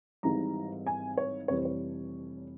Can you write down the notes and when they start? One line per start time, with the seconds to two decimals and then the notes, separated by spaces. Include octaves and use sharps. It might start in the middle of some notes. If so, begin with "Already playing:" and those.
0.23 G#1 G#2 E3 G3 A#5
0.87 G#5
1.17 C#5
1.48 F1 F2 E3 G3 C#5
1.57 C5
1.65 C#5